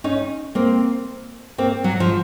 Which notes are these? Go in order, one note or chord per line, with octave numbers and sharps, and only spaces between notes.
C#4 D#4
A#3 C4
A#3 C4
F#3
F3